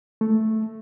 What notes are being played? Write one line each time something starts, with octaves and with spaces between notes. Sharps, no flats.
A3